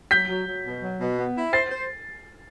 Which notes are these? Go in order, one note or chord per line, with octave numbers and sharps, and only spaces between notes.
F#3 G6 B6
F#3
F#3
B2
F#3
B2
B3
E4
C5 A6 C7
C5